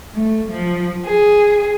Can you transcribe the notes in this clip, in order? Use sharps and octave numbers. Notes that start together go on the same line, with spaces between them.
A3
F3
G#4